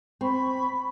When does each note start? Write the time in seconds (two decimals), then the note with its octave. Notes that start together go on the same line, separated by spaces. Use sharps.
0.21 C4 B5 C#6